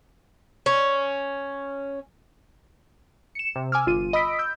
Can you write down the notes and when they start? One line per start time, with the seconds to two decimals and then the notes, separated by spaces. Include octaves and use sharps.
0.66 C#4
3.35 C#7 E7
3.56 C3
3.72 G#5 D6 E6 F6
3.87 G1 F4 D#7
4.13 D#5 B5 D#6 E6 B6 D7
4.39 E6 G6